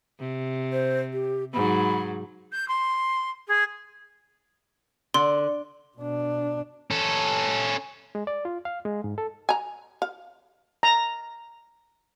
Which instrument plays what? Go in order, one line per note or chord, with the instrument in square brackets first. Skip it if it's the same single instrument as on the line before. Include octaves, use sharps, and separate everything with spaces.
[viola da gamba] C3
[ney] C5
G4
[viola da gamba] G#2 F#3 [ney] B5
[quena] G6
C6
G#4
[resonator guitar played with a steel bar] D3 [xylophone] C6
[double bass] B2 D4
[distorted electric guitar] C#4 A4
[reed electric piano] G#3
D5
F4
F5
G#3
G#2
A4
[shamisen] G#5 A#5
F5
[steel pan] A#5